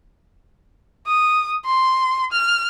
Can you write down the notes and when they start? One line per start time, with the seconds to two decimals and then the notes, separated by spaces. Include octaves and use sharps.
1.06 D#6
1.65 C6
2.32 F6